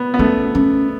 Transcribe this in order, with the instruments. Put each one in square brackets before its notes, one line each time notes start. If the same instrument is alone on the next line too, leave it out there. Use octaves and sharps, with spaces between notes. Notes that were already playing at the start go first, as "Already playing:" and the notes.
Already playing: [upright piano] B3
B3
[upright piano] A3 [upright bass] C#4
[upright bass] C#4